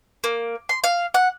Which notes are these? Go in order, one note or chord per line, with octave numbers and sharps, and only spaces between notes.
A#3
C6
F5
F#5